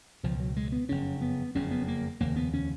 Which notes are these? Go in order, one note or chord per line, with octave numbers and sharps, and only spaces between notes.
C#2 B2 F3
F#3
G#3
B3
F#1 F2 C#3 C#4
B3
F#1 F2 C#3 C#4
B3
A#3
F1 D#2 C#3 A#3
B3
C#4